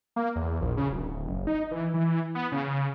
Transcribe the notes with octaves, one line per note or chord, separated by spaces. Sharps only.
A#3
E2
A#1
C#3
D1
F#1
D#4
E3
E3
B3
C#3